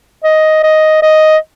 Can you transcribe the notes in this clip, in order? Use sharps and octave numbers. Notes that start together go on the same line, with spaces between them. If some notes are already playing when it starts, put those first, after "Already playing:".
D#5
D#5
D#5